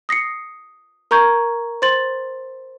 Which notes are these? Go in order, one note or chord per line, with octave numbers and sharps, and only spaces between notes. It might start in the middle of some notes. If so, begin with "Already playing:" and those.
D#6 A#6 C7 C#7
A#4 A#5 C#6 G6 G#6
C5 C6 A6 F#7